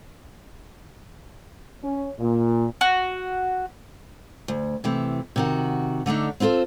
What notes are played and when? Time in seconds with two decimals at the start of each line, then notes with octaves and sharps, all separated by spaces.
1.84 C#4
2.19 A#2
2.81 F#4
4.48 D2
4.84 C3 E3 A3
5.36 C3 D#3 F#4
6.06 D3 A3 D4 D#4
6.40 C4 E4 F4 A4 C5